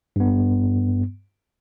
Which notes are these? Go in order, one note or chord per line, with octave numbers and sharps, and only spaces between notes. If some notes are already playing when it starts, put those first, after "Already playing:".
G2 B3